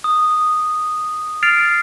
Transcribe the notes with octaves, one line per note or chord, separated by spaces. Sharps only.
D#6
F6 A6 C7 D7 F7